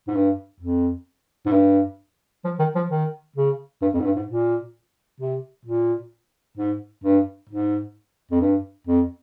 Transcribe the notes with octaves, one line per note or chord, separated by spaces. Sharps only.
G#2
G2
F2
G#2
G2
F3
D#3
F3
D#3
C#3
G2
F2
G#2
G2
G#2
A#2
C3
A#2
G#2
G2
G#2
F2
G2
F2